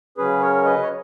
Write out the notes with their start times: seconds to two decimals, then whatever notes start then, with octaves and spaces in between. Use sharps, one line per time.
0.18 C#3 F#3 C#4 G#4 B4
0.41 A#4 C#5
0.65 B4 D#5
0.83 C#5